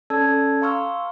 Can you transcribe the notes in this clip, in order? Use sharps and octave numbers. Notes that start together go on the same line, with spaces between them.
C#4 A4 D5 A5 E6 G#6
F5 A#5 C6 C#6 E6 F6